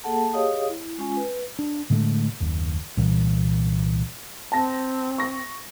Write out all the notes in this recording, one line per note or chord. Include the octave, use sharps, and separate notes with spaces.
A#3 G#4 A4 F#5 A5
G4 G#4 C#5 D#5 F5 D#6
E4
G#3 C#4 F4 G#5
B4
D4
A2 D3 G#3 A3
F#1 D#2
C2 A#2 E3
C4 A5 A#6
C#6 A#6